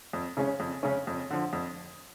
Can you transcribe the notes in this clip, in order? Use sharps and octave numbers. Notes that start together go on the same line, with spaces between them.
F2
C#3 G#3 C#4
F2
C#3 G#3 C#4
F2
D3 F3
F2